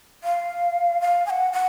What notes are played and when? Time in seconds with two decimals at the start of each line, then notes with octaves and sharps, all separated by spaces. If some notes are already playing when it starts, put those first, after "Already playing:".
0.24 F5
1.01 F5
1.26 G#5
1.30 F#5
1.53 F#5